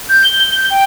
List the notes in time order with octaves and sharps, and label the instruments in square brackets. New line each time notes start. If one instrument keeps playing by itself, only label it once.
[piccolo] G6
G7
G7
G6
G5